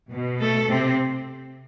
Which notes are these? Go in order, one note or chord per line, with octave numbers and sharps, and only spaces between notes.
B2
A3 A4
C3 C4